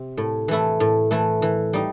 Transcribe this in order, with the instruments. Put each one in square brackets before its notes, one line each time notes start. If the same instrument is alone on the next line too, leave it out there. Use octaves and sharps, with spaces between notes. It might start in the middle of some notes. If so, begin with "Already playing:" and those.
Already playing: [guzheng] C3
A2
E3 A3 E4
A2
E3 A3 E4
E3
G3 D#4